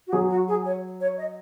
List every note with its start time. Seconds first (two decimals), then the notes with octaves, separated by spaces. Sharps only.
0.07 F#4
0.13 F#3 G#4
0.29 F#4
0.48 G#4
0.65 C#5
1.00 C#5
1.17 D#5